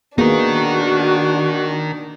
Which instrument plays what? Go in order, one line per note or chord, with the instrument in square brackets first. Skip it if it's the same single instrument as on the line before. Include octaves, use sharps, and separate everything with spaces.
[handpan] A#3 B3 G#4 [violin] D4 [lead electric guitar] D#4 A#4 [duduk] F#4